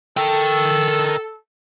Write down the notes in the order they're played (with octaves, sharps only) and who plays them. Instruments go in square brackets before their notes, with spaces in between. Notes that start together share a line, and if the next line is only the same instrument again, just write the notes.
[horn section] A4 [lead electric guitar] A#4 G5